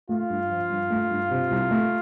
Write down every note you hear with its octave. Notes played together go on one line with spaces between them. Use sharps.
A3 F4
G2
F3
G2
A3
G2
C3
C2
A3